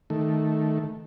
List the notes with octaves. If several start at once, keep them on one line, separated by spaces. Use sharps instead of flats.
D#3 A3